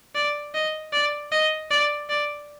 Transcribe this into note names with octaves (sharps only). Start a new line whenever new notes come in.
D5
D#5
D5
D#5
D5
D5